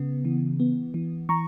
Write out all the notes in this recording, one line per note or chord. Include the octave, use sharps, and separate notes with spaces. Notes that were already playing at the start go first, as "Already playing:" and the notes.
Already playing: C#3 B3
E3
B3
E3
E3 A#5 C#6